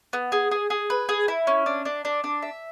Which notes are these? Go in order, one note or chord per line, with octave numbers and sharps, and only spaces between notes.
B3
G#4
G#4
G#4
B4
G#4
E4
C#4
D4
D4
D4
D4
E5